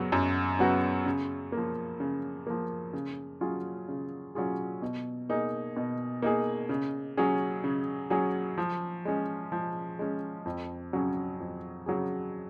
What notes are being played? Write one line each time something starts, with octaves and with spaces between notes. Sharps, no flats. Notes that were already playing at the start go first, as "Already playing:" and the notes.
Already playing: F#2 C#3 F#3 B3 F#4
F#2
C#3 F#3 B3 F#4
C#3
F3 A#3
C#3
F3 A#3
C#3
F#3 C#4 F4 G#4
C#3
F#3 C#4 F4 G#4
B2
A#3 D#4 G#4
B2
A#3 D#4 G#4
C#3
F#3 C#4 G#4
C#3
F#3 C#4 G#4
F3
G#3 C#4
F3
G#3 C#4
F2
C#3 F#3 C#4 G#4
F2
C#3 F#3 C#4 G#4